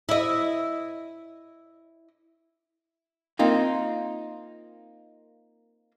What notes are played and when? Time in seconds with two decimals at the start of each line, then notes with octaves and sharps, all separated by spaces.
0.09 E4 D#5
3.39 A#3 C4 D#4 F4